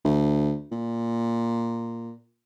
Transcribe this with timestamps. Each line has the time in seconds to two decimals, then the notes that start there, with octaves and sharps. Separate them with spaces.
0.05 D2
0.72 A#2